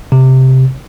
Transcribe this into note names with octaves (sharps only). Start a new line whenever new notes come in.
C3